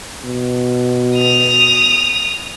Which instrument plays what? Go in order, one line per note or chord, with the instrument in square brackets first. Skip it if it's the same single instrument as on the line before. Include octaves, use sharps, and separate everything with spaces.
[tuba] B2
[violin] D#6 F7